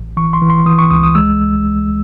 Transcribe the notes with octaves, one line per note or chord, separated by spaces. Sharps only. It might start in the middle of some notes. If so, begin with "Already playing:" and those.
Already playing: A1
E3 C#6
C6
E3
C6
E3 D#6
C#6
C#2 D#6
D#6
G#3 E6